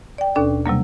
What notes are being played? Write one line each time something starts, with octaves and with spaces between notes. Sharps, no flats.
D5 G5
D#2 B2 C#4 D4 A4 D5
C3 F#3 G3 A#3